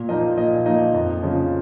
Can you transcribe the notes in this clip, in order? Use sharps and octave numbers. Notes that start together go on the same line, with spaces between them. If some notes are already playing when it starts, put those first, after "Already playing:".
Already playing: A#2
F3 A#3 D#4 D#5
A#2 D#5
F3 A#3 D#4 D#5
F2
C#3 F3